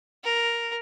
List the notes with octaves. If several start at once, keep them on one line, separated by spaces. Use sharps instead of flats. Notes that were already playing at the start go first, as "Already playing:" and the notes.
A#4